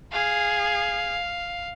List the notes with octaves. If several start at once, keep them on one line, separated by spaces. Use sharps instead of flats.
G#4 F5